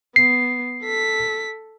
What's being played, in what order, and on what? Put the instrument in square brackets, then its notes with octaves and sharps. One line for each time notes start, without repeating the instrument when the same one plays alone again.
[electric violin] B3 [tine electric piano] C7
[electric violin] A4 B6